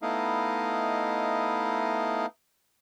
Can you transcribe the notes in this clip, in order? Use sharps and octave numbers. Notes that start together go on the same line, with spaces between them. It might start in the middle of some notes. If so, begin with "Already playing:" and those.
A3 B3 D#4 E4 D#5 F5